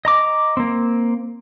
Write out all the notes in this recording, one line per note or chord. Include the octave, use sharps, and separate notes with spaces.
D#5 A#5 D6
A#3 C4